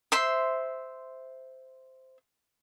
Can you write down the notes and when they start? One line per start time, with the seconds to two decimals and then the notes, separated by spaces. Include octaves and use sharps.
0.12 C5 E5 C6